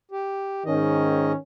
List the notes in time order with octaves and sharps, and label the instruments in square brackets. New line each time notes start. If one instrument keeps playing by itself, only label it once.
[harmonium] G4
[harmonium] G#2 D#5 [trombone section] D#3 C#4